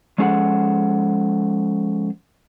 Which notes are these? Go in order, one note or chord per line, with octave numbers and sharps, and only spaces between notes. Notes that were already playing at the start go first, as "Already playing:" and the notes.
F3 G#3 C#4 G#4 A4 F#5